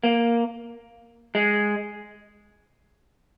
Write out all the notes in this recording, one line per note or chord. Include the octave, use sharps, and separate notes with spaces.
A#3
G#3